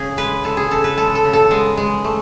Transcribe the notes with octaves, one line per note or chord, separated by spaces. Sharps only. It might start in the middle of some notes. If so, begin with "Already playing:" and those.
Already playing: C#3 G#4
G#3 B4
G#3 A4
G#4
C#3 A4
B4
G#3 A4
A4
C#3
A4
G#3 B3
G#3
A3